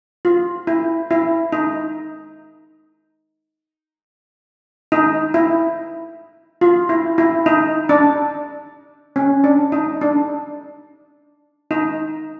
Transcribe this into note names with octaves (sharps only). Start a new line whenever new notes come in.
F4
E4
E4
D#4
D#4
E4
F4
E4
E4
D#4
D4
C#4
D4
D#4
D4
D#4